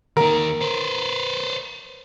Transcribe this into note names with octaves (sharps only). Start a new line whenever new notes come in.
D#2 D#4 A#4
B4 C5